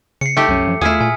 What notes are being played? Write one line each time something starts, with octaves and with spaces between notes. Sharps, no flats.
C#3 C7 C#7
A3 D#4 G4
C2 F#2 C#4
F3
E2 A3 E4 F4 G#4 D#6 F6 B6
A#2 G#5